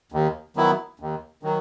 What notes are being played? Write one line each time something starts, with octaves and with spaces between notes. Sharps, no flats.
D#2
D#3 F#3 B3 E4
D#2
D#3 F#3